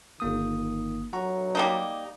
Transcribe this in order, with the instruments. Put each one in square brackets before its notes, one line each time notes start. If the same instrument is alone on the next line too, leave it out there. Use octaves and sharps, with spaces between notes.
[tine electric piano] G1 A#3 D#6 [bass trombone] D#3
[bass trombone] F#3 [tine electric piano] F#5 A#5 C#6
[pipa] G3 A#3 D#4